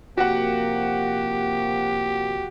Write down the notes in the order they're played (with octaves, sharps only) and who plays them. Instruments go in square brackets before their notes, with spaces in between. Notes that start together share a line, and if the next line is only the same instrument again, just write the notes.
[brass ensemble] C3 F3 A#3 [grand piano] F#4 F#5 [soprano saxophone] G4